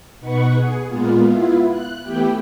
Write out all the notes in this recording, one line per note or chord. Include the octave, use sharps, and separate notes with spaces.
B2 D#4 B4 F#5 C#6
G#4
A#2 G#3 A#3 B3 F4
B3 E4 F4
F#6
E3 A3 B3 E4 G4 G5